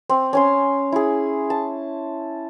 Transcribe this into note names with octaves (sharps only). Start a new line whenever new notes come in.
C4
C#4 G#5 C6
E4 G#4
A5